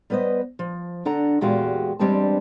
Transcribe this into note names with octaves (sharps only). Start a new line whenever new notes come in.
G3 B3 B4 C5 D#5
F3
D3 D4 A4 F#5 A#5
E2 A#2 G#3 F#4 G4 F5
E2 G3 G#3 C4 D4 A5